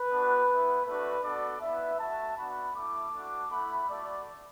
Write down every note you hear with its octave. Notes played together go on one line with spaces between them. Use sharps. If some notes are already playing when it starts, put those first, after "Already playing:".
Already playing: B4
B3 D4 F#4
B3 E4
A3 D4 F#4 B4
B3 D4 F#4 A4 D5
B3 E4 B4 E5
A3 F#4 E5 A5
B3 D4 F#4 F#5 B5
A3 E4 A5 D6
A3 D4 F#4
A3 E4 F#5 B5
A3 F#4 A4 D5